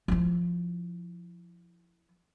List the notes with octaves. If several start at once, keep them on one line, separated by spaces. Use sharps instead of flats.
F3 E4